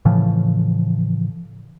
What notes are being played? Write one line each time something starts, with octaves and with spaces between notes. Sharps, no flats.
A2 C#3 E3 F3